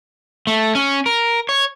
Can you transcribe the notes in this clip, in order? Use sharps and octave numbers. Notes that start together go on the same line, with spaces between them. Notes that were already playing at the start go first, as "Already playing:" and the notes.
A3
C#4
A#4
C#5